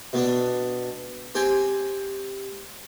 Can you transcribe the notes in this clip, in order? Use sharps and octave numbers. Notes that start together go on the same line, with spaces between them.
B2 B3 D4
C4 G4 G5 G#5